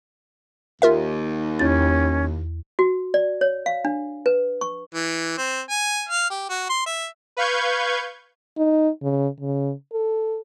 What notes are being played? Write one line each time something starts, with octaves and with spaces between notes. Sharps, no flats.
D#2 F4 A#4 E5
E2 C#4 A6
F#4
D5
C#5
F5
D4
B4
C#6
E3
C4
G#5
F5
G4
F#4
C6
E5
B4 F5 C#6 G6 G#6
D#4
C#3
C#3
A4